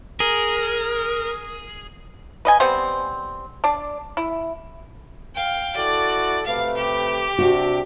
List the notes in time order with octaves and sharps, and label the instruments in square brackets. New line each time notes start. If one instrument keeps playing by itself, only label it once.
[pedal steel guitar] G#4 [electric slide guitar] A#4
[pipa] B4 D#5 G#5
G3 B3 C4 C5
D4 D5
E4
[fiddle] F5 G5
[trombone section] E4 F#4 A4 [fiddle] D5
[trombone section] C3 A3 B4 [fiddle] F5
[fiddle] G4
[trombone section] C3 D4 [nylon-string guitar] F#4